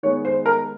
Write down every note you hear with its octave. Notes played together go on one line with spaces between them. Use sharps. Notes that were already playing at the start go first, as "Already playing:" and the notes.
D#3 G#3 B3 C#5
C5
A#4